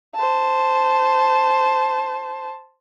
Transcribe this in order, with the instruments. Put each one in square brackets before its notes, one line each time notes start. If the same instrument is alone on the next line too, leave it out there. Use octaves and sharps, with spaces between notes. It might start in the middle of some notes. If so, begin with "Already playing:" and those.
[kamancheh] C5 A5